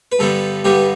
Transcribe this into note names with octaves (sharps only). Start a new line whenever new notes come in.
B4
G2 D3 G3 B3 A4
G2 D3 G3 B3 G4